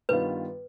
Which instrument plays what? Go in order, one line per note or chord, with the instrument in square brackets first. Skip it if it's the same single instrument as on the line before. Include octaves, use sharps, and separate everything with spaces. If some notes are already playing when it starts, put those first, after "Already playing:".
[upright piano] G2 D#3 B3 F4 [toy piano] B4